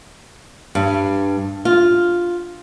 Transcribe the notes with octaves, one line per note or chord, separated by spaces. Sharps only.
G2
F4